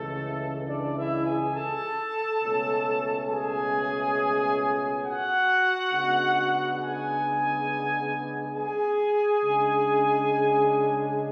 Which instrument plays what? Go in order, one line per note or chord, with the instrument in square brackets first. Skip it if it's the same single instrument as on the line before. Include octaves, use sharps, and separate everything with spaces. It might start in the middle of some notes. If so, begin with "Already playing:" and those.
Already playing: [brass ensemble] C#2 C#3 E3 A3 A4
D4 D5
E4 E5
G#4 G#5
A4 A5
C#2 B2 A3 C#4
G#4 G#5
F#4 F#5
C#3 G#3 B3 D4
G#4 G#5
G#4 G#5
C#3 G#3 D4